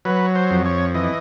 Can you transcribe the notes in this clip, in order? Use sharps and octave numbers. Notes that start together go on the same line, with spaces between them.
F#3 B4
C5
F2
C#5
E3 D#5